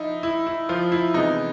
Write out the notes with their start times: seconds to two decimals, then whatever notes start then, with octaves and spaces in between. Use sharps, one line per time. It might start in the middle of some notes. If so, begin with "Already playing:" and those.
Already playing: F3 D#4 E4
0.23 E4
0.47 E4
0.69 F3 F4
0.92 E4
1.14 C3 E3 G#3 B3 D#4